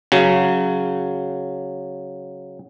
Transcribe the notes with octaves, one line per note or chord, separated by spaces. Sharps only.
C#3 F#3